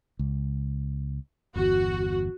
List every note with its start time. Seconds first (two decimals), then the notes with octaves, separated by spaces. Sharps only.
0.19 C#2
1.56 G1 E2 F#4